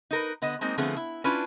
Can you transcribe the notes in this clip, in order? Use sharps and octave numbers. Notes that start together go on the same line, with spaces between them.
D#4 A#4 B4
D3 B3 D#5
G#3 A#3 C4 D#4
D3 F3 A3 B3 C4 G#4
E4
C#4 D4 E4 F4 B4